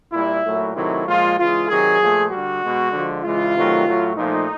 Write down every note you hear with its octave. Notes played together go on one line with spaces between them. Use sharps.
A#2 G3 E4
A#2 F#3 A3
C3 D#3 F#3 A3 E4
A#2 F3 G#3 F4
C#3 E3 G#3 F4
C3 D#3 F#3 G#4
A#2 F3 A3
D3 G3 F#4
B2 G#3
D3 F3 G#3
C#3 E3 G#3 F4
C3 D#3 F#3 A3
A2 F#3 A3
A#2 F3 A3 D#4